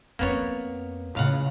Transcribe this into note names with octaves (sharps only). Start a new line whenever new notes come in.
F2 A#3 B3 C#4 C#5
C#2 A2 C#3 F5 F#5